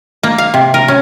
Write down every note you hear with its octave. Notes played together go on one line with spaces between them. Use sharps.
A#3
F5
C3
A#4
C#4